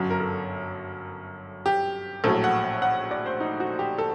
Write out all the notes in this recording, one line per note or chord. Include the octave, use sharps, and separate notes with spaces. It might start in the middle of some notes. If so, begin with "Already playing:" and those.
Already playing: G1 F#2 F#3
A#4
A4
G4
A#1 A2 F#3 A4
F#5
F#5
D5
C5
D#4
F#4
G4
A4